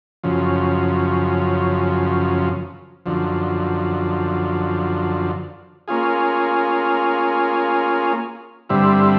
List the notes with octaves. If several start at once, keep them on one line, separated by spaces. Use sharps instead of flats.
F#2 C#3 F3
F#2 D3 F3
A#3 C#4 F4 G#4
G2 D3 G3 C4 E4